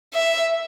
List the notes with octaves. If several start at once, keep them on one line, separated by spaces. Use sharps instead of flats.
E5